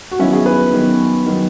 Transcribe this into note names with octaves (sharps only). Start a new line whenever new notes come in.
F#4
D#3 F#3 B3 C#4 E4
E4 G#4
G#4 B4
D#3 F#3 B3
D#3 F#3 B3